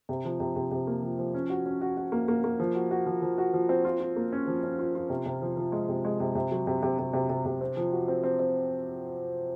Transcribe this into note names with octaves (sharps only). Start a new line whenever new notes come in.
C3
F3
C3
C3
C3
A#3
F3
F3
C#4
F#4
C#4
F#4
F#4
A#3
A#3
A#3
F3
F#4
F#4
F3
F3
F#4
F3
C4
F4
F4
A#3
C#4
F3
C#4
F4
F4
C3
C3
F3
F3
G#3
C3
G#3
C3
C3
F#3
C3
C3
C3
C3
C3
C3
C4
F3
F#4
C4
C4
C4